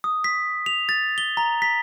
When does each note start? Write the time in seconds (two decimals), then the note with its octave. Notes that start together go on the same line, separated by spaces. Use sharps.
0.04 D#6
0.24 B6
0.66 F7
0.89 A6
1.18 G7
1.37 A#5
1.62 B6